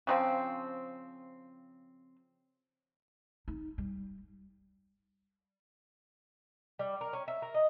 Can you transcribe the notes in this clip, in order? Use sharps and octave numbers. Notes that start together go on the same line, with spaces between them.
C#3 F3 C4
D#4
G3
G3
A#4
C#4
E5
A#4
D#5